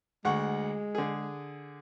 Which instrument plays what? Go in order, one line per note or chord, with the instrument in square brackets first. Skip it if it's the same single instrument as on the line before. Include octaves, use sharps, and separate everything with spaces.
[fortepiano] D2 F#5 C#6 [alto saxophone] G#3
[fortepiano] D3 G#4